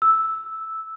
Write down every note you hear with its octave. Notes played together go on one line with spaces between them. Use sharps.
E6